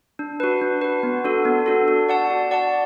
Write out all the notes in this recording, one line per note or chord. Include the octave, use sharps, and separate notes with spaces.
D4
F#4 B4
D4
F#4 B4
B3
D4 F#4 A4
B3
D4 F#4 A4
F#4
D5 F#5 A5
F#4
D5 F#5 A5